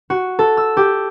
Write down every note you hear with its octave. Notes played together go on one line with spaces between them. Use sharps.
F#4
A4
E6
G4